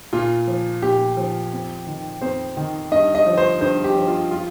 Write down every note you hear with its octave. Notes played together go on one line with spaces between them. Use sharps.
A#2 F4
F3
A#2 G4
F3
F2
D#3
F2 C5
D#3
G2 D#5
D#5
F3
C5
G2 C5
G4
F3
F4
F4